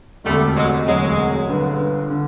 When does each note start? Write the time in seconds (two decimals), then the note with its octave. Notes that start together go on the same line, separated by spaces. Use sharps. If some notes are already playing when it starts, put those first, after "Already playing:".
0.25 E1 D2 C3 G3 A3
0.56 F#3 G#3
0.86 E1 D2 C3 F#3 G#3
1.48 G1 G2 D3
2.10 D3